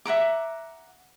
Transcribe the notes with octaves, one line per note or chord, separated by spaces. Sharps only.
E5 F#5 A#5 D6